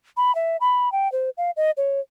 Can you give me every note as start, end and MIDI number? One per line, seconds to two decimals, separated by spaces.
0.17 0.34 83
0.35 0.57 76
0.61 0.92 83
0.92 1.10 79
1.12 1.30 72
1.37 1.51 77
1.56 1.71 75
1.77 2.00 73